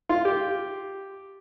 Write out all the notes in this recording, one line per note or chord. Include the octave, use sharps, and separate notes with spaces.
F4
G4